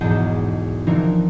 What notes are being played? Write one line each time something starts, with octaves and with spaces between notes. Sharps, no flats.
B1 E2 G#2 D#5 A5 G6
D3 E3 F3 C4 D#4 A#4